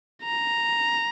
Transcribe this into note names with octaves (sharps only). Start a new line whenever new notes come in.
A#5